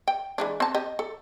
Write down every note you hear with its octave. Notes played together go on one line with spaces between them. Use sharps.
G5
E3 G#3 D4
C4 A5
G4 D#5
A4